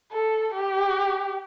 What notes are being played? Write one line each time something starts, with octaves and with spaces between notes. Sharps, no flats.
A4
G4